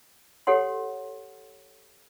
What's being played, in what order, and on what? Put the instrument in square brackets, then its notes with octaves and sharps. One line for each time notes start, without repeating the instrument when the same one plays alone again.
[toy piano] G4 A4 C#5 F#5 C6